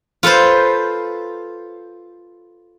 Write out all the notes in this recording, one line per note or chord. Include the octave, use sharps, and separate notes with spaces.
F4 A4 B4 C5